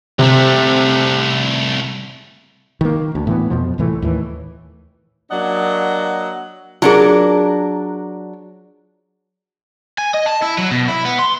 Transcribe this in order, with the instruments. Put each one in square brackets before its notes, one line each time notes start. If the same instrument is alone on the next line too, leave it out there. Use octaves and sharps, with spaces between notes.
[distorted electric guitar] C2 A3 [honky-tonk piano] C3
[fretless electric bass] D#3 A#3
D2
A2 E3 B3
F2 B2 F3
C2 A2 E3 A3
D#2 A2 E3
[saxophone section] F#3 A#3 D4 D#5 F#5
[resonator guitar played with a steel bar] F#3 D4 A#4 [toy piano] F4 G#4
[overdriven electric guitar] G#5
D#5
A5
E4
F#3
B2
E4
B3
C6